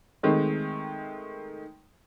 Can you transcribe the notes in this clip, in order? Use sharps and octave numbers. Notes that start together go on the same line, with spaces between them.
D#3 G#3 A3 C4